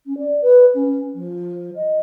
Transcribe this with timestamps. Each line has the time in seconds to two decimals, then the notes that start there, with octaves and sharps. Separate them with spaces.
0.06 C#4
0.18 D5
0.42 B4
0.74 C#4
1.15 F3
1.76 D#5